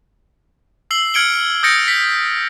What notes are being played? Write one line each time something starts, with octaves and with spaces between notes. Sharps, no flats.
E6 C7 F#7 G7
F6 G#6 C#7 D7 F#7 G7
D#6 G6 A6 A#6 C#7 D7
B6